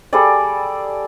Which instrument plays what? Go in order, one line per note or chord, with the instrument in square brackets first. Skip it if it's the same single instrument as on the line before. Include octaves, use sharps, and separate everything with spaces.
[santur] G3 G#4 A4 D5